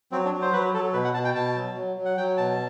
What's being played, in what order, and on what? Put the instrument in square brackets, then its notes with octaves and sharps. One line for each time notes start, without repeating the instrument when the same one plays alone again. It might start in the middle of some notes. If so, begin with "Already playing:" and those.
[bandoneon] F#3 C4
D4
F#3
C5
F#3 B4
F#3 A4
B2 B4
F#5
B2 A5
G5
B2 A5
F#3
F#3
F#3
F#5
F#3 G5
B2 A5